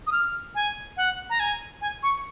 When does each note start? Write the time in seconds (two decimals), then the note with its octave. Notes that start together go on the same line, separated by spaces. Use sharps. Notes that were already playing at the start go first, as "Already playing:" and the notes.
0.07 D#6
0.12 F6
0.55 G#5
0.97 F#5
1.30 A#5
1.40 G#5
1.81 G#5
2.03 C#6